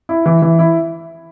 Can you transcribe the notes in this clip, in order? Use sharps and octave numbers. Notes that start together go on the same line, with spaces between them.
E4
E3
E3
E4